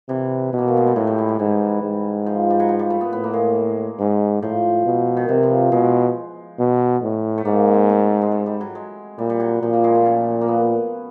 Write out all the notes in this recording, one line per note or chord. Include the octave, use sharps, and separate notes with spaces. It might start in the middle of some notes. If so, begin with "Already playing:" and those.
C3 E3
B2
A#3
A3
G#3
G3
A2 F#3
G3
G#3
G3
G#2 E3
G#2
F3
G3
F#3
F3
G3
A3
B3
A2 B3
A#3
G#3
G#2
A2 F3
B2
D#3
C3 E3
F3
B2 G#3
B2
A2
A3
G#2 A#3
C#4
C4
A3
G#3
A3
G3
F#3
G#3
A#2 G3
G3
F#3
A#2 F3
A#3
G#3
A3
C#4
A#3
B3